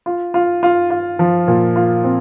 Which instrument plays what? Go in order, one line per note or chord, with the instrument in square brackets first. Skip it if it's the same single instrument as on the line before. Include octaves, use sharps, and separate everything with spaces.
[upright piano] F4
F4
F4
F4
F3
A#2
F4
C4